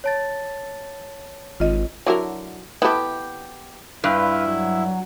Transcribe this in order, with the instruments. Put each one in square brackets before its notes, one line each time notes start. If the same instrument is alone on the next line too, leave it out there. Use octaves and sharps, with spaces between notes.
[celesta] C#5 A5 A6
[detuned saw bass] G#1 [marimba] F4 D#5
[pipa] D3 [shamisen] F#3 E4 A#4
[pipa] B3 G4 [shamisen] E4 A4
[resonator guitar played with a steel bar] G2 [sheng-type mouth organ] E4 [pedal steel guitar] F4 B4
[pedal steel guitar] F#3